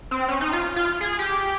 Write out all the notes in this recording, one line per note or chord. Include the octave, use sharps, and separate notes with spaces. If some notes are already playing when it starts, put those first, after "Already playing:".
C4
C#4
D#4
F4
F4
G#4
G4